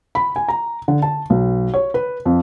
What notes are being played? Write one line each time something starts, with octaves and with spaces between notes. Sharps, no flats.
B5
G#5
A#5
D3
A5
B1
C#5
B4
F2